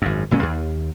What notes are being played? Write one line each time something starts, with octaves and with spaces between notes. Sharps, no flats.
G#1 F#2
F#1 A#2 G#3 C#4
D#2